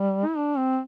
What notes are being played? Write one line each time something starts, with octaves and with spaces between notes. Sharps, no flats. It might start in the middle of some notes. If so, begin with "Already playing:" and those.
Already playing: G3
E4
D4
C4